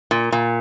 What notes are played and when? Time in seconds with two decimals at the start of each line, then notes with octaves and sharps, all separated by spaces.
0.11 A#2
0.32 A#2